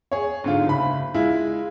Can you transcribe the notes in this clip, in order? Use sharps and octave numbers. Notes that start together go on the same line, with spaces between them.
G#4 C#5
G#2 D3 F4
F#1 B5
G#3 E4 F4